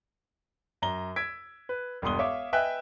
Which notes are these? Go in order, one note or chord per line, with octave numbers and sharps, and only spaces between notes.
F#2 A#5 G7
E6 G#6 B6 D7
B4
E1 G2 F#4 C6 D#6 G7
C#5 E5 F5 D6
B4 D#5 E5 G5 G#5 F#6